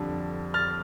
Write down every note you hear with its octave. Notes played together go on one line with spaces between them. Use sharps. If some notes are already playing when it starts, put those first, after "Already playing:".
Already playing: F2 D3 G3
F6 A6